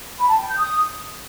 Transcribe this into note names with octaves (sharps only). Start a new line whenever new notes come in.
B5
A5
G5
G6
D#6